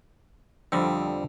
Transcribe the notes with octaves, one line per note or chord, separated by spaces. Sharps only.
F2 D3 F3 G3 C4 E6